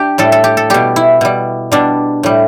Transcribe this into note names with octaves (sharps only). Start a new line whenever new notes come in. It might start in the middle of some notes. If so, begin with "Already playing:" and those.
Already playing: D4 G4
A2 G3 A4
A4
G4
A4
B2 G3 G4
E4
B2 G3
B2 G3 D4
A2 G3